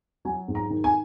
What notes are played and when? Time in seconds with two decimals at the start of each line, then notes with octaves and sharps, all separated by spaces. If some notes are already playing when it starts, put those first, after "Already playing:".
0.25 F#3 G#5
0.48 G#2
0.55 A#5
0.70 D#3
0.84 G#5